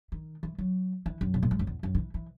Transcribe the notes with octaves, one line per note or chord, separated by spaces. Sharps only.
D#3
E3
F#3
E3
F#2
B2
A#2
G#2
F#2
E2
F#2
D#3
E3
E3